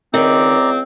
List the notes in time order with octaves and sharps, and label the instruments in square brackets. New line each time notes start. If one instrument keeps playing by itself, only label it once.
[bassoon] C#2 [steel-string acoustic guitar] D#3 [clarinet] C4 [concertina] D5 A#5 D6